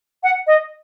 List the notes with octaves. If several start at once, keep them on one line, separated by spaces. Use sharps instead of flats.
F#5
D#5